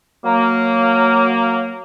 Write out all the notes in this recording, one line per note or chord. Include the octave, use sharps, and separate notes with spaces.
F#3 A#3